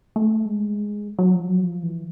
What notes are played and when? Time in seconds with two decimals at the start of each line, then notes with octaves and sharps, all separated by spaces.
0.16 A3
0.46 G#3
1.19 F#3
1.34 F3
1.49 F#3
1.63 F3
1.83 E3